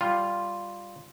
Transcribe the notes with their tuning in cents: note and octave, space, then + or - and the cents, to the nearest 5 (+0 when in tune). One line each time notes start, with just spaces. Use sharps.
G3 +0 F4 +0